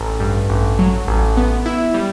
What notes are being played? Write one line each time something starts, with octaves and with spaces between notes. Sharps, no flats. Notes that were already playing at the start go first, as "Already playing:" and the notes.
Already playing: A1
G2
A1
F#3
A1
B3
E4
G3